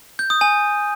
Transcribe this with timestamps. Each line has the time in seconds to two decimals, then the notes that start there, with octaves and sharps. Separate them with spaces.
0.19 G6
0.30 D#6
0.41 G#5